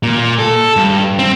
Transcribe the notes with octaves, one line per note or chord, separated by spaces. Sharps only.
A#2
A4
G2
C4